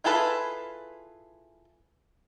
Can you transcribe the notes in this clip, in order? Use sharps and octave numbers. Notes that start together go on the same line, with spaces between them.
E4 F4 G#4 A4 B4